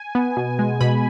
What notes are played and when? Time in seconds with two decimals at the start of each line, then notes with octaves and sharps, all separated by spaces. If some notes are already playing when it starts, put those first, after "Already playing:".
Already playing: G#5
0.15 B3
0.37 B2
0.59 G#3
0.81 B2 B5